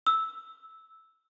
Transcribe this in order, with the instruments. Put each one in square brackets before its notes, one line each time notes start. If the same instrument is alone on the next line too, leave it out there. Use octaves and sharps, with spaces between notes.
[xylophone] E6